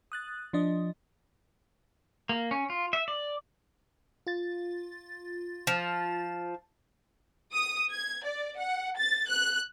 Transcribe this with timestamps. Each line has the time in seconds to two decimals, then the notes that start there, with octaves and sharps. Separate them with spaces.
0.12 D#6 F#6 A6
0.53 F3 D4 D#5
2.29 A#3
2.51 C#4
2.70 F4
2.93 E5
3.08 D5
4.27 F4 A6
5.67 F3
7.54 D#6
7.91 G#6
8.25 D5
8.58 F#5
8.98 A6
9.28 F#6